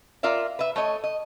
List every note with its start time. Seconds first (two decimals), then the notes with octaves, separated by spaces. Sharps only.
0.23 F4 A#4 D5 E5
0.59 B4 E5
0.76 A3 C#5 D#5
1.04 D#5